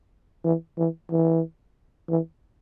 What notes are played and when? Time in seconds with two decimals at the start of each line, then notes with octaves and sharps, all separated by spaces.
0.45 E3
0.78 E3
1.11 E3
2.09 E3